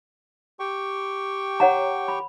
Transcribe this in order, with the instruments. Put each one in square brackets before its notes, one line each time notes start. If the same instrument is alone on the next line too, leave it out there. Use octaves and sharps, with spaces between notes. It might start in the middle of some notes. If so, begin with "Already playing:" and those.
[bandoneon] G4 G5 C#6
[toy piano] C#5 F#5 A#5
B5